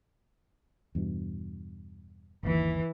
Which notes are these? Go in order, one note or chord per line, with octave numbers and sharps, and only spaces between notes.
E2 G2 B2
G1 D#2 E3